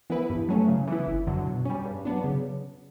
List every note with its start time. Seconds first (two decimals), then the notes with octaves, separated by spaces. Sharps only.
0.10 E3 B3 E4 B4
0.30 G2
0.49 F#3 A3 C#4
0.68 C#3
0.87 E3 B3 E4
1.07 G1
1.27 F#2 D3 F#3
1.46 B2
1.65 G3 C#4
1.85 G2
2.05 F#3 B3 D4
2.24 C#3